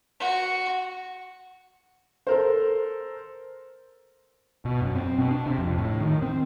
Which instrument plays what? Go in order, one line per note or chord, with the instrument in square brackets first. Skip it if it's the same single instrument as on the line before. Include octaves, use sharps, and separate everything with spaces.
[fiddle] F#4
[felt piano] A4 A#4 C5
[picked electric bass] B2
F#2
C4
B2
D4
C3
F2
A2
D#3
C4